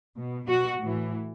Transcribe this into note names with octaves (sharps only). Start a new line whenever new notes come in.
B2
B2 F#4
A2 E3